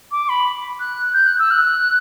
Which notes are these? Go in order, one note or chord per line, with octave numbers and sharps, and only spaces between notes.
D6
B5
F#6
G6
F#6
E6
F#6